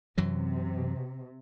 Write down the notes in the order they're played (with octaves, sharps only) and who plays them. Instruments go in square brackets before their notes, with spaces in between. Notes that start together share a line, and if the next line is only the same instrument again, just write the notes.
[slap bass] F#2 E3 F#3 [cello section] C3